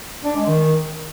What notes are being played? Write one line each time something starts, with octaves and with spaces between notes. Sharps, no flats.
D4
G#3
D#3